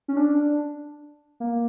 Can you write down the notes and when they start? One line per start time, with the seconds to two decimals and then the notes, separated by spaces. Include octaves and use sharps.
0.08 C#4
0.17 D4
1.40 A#3